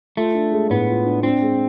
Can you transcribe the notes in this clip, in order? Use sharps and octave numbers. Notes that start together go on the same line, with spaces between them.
A3 F4
D4
G#3
A2 B3
F4
D4
C4 D4
G#3